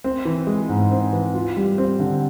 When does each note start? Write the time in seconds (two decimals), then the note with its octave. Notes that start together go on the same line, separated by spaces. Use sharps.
0.04 C4
0.25 E3
0.47 G#3
0.69 G#2
0.91 C4
1.13 E3
1.34 F4
1.57 G3
1.78 C4
1.99 D3